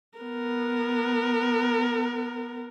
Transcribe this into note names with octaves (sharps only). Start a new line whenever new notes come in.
B3 A#4